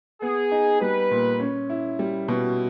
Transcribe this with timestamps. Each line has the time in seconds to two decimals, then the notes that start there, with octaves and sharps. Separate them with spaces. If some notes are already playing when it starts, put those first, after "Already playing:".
0.22 B3 G#4
0.51 D#4
0.81 G3 B4
1.11 A#2
1.40 C#4
1.70 E4
1.99 G3
2.28 B2